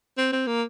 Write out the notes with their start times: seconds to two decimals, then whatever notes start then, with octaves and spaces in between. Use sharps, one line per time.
0.18 C4
0.32 C4
0.47 A#3